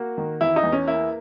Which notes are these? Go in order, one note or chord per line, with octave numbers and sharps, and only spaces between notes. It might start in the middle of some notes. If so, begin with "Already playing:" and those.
Already playing: A#3 F#4
D#3
E2 E4
D#4
E2
C#4
A#3 E4